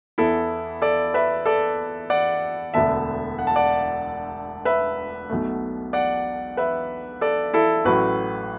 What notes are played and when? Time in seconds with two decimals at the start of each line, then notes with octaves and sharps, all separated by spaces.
0.18 E2 E3 B3 E4 A4
0.82 A4 D5
1.14 B4 E5
1.46 A4 D5
2.10 D5 F#5
2.74 E1 D2 D3 B3 E5 A5
3.39 F#5
3.47 A5
3.56 D5 F#5
4.65 B4 E5
5.30 B1 B2 A3
5.93 D5 F#5
6.57 B4 E5
7.21 A4 D5
7.53 E4 A4
7.85 A1 A2 F#3 A3 F#4 B4